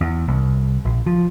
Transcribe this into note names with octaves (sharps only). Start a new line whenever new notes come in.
E2
C2
A#1
F3